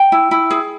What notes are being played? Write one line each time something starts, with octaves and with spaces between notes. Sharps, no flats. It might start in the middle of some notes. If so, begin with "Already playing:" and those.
Already playing: G5
E4
E4
G#4